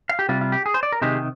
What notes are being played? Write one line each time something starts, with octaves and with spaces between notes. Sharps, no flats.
F5
G4
C3 G3 F4
F4
G4
G#4
C5
D5
A#4
C3 D#3 G#3 G4